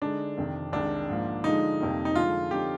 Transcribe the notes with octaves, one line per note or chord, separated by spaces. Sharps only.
D3 G#3 D4 D#4
F2 C3 D#3
C2 C3 D#3 G#3 D4
G#2 F3 A#3
D3 F3 G#3 D#4
F2 C3 G3 A#3
D#4
D3 F3 G#3 F4
D3 F3 C4 D#4 G4